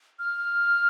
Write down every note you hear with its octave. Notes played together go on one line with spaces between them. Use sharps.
F6